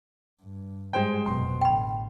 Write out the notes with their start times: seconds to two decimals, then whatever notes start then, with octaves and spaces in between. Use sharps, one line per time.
0.43 G2
0.93 G#2 G3 G#3 C5 G5
1.26 F1 F#2 B2 C6
1.61 A1 D3 G5 B5